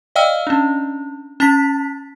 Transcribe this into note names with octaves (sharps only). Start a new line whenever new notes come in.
D5 D#5 F5 G5 E6 F6
C#4 D4
C#4 A5 A6 B6